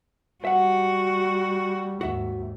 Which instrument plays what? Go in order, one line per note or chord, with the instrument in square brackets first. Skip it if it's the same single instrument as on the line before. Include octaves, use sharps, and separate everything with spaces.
[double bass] G3 [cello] F#4 [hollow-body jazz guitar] E5 F#5
[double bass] D#2 G#2 [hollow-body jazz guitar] F#4 E5